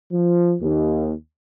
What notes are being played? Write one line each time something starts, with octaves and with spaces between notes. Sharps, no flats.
F3
D#2